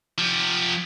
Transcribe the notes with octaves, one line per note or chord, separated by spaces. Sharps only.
F3 G4